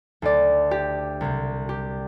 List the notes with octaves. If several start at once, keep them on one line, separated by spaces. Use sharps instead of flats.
D2 D3 D5
G4
C2 C3
G4